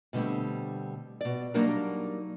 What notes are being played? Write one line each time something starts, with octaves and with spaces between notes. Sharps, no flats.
B2 D3 G3 A3 C4
B2 D5
F#3 G3 A#3 D4 D#4 A#4